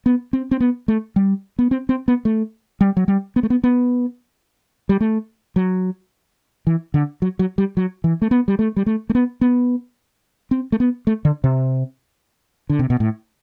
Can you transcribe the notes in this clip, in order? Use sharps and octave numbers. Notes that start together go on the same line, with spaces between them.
B3
C4
C4
B3
A3
G3
B3
C4
C4
B3
A3
G3
F#3
G3
B3
A3
B3
B3
G3
A3
F#3
E3
D3
F#3
F#3
G3
F#3
E3
A3
B3
G3
A3
G3
A3
A3
B3
B3
C4
A3
B3
A3
D3
C3
D3
C3
B2
A2